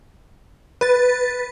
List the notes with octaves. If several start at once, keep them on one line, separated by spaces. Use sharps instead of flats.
B4 A6